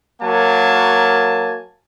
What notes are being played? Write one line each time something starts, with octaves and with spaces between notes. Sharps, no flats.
F#3 A#3 A#4 G#5 A5